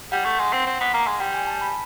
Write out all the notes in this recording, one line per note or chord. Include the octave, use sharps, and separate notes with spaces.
G3 F#5
A3
G#3
C4
C4
B3
A#3
G#3
G3 G5
G#5
A5
B5